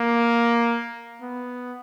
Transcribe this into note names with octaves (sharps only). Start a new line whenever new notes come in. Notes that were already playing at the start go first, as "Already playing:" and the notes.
Already playing: A#3
B3